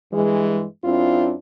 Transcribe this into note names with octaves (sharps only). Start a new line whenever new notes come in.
G2 E3 G#3
F#2 C4 D4 E4 F4